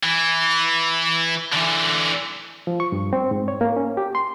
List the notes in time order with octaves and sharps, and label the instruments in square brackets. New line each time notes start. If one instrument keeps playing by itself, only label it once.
[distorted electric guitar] E3
D3 E3
[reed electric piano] F3
C#6
G2
C4
G#2
C#5
A#3
C#4
G4
C6